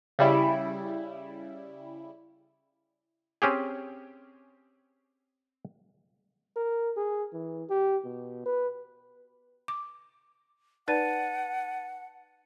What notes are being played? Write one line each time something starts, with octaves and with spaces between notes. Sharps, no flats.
C#3 G3 E4
C4 C#4 G4 G#4
A#4
G#4
E3
G4
B2
B4
D6
D#4 B4 D5 F#5 A5 A6 D#7